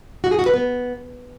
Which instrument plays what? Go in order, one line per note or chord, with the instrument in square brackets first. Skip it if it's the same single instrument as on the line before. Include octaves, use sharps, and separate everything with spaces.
[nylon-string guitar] F#4
G#4
F#4
B4
B3